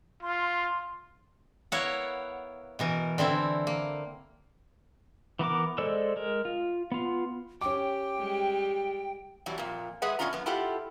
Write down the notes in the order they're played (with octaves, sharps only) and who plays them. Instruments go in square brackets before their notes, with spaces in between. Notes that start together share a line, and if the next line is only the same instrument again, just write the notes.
[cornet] F4 [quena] C6
[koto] B3 E4 A#4 C#5 F5 F#5
B2 E3 A#4
D3 E3 C4 E4
A#3
[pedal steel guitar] E3 B3 A#4 D6
G#3 A4 C5 D5 E6
G#3 A#4
F4
B3 F4
[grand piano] C#4 D6 [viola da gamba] G4 [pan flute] G5
[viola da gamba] G3 G#3 G4
[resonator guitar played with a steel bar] B2 E3 F#3 G3
F2 A#2
G#3 G#4 B4 E5 F#5
B2 D#3 C#4 D4 F4 A#5
F#2 B3
E4 F4 G4 A4 F#5